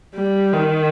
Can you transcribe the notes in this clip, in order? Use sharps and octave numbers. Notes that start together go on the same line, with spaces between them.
G3
D#3